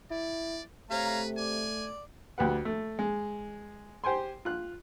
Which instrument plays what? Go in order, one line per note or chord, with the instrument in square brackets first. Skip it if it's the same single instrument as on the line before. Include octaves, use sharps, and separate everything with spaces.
[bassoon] E4 [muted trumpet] D5
[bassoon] C3 [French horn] A3 [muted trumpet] B4 [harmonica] C#5 F5 A#5
[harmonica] D5 [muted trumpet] G#5
[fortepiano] D2 G4 B4 F#5
A3
G#3
G4 C5 G5 G#5 C6
F4 F#6